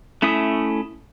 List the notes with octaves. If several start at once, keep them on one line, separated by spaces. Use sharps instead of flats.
A3 C#4 E4 E5 D#6